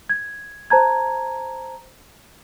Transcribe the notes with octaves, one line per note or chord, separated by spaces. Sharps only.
G#6
C5 A5 A#5 G#6